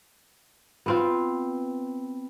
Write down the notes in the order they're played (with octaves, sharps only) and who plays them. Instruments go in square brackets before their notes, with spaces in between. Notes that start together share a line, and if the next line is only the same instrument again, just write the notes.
[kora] B3 C4 F4